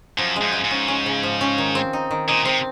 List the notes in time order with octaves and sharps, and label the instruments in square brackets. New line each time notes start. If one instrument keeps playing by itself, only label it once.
[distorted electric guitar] F#2 [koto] F3
[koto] G#3
[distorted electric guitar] F#2
[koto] G#3
[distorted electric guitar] G#2
[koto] C#4
C#4
C#3
F3
C#4
D#3
C4
D#4
D#3
[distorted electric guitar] A#2 [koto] D#4
[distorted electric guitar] C3 [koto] C4